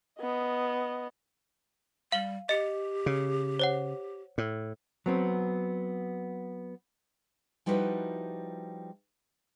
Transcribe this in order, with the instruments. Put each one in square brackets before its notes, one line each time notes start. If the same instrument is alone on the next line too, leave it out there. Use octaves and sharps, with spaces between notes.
[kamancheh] B3 D#5
[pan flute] G3 [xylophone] F5 F#7 G7
[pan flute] G4 [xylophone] D#5 C#7
[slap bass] C#3
[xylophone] C5 C#5 F#5
[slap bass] A2
[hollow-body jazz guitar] F#3 B3 C4
[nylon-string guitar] F3 G3 D#4 E4 F#4 B4